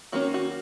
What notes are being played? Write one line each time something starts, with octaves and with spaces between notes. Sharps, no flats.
D#3 A#3 C#4 F#4
F#4